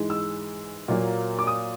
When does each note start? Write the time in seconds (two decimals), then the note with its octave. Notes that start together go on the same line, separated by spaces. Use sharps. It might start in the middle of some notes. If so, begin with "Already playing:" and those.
Already playing: G#2 E3 G#3
0.10 E6
0.88 A#2 F#3 A#3
1.39 D6
1.47 D#6